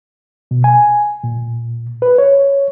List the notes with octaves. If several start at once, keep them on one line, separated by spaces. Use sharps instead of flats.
B2
G#5
A#2
B4
C#5